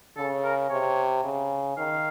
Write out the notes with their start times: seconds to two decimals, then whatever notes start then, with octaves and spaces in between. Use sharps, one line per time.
0.17 C#3 A4
0.44 A#4
0.70 C3 C#5
1.24 C#3
1.77 D#3 F5